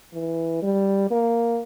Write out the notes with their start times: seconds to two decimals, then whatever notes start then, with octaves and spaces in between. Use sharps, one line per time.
0.13 E3
0.62 G3
1.11 A#3